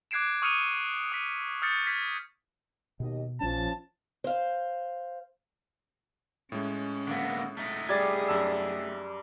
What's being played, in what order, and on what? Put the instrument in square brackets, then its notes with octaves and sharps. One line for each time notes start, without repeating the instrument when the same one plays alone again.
[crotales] D6 F#6 G#6 C7 D7 E7
C#6 D#6 F6 C#7 D#7 F7
D#6 B6 D#7
D#6 F6 G6 A6 C#7
F6 G#6 B6
[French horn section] D#2 G4 D#5 [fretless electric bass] B2
[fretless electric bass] A#1 D4 [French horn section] F3 C#4 [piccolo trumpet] A5
[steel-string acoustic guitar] C5 F5
[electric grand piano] A2 G#3 [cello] C#4
[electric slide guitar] D3 A#3 B3
A3 D#4
[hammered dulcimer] G3 D5 [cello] G#4 [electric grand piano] G#6 A6
[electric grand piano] F#2 A5 E6